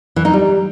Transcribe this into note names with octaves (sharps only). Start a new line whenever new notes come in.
E3
D#4
G3